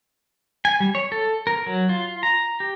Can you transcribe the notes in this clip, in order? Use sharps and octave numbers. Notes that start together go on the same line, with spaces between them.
G#5
G3
C#5
A4
A#4
F#3
F4
A#5
G4